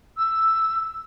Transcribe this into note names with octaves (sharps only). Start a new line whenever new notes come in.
E6